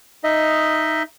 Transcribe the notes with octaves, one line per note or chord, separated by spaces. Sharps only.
D#4 D#5 E5